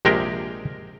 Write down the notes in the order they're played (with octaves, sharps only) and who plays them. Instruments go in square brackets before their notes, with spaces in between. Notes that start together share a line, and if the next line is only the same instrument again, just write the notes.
[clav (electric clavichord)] A#1 C3 G#3 G4 A#4 G5